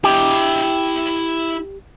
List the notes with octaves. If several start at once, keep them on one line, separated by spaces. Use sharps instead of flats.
E4 G4 D#5